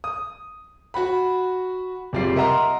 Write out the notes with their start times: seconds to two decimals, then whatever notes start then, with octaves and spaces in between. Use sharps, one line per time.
0.04 D#6
0.94 F#4 F#5 B5
2.13 F#1 C3 G3 F4 C7
2.36 A#4 D#5 E5 F#5 A#5 C6